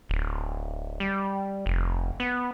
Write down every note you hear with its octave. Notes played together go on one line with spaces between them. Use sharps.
D1
G3
F1
B3